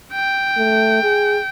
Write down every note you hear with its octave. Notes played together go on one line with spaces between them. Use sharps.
G5
A3
G#4